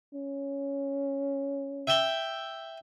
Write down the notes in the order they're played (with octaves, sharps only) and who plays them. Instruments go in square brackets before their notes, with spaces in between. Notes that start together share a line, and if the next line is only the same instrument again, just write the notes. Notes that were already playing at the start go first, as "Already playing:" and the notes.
[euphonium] C#4
[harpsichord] E5 G5